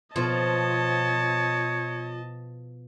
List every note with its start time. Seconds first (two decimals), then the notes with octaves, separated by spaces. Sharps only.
0.16 B2 F3 C#5 D#5 A5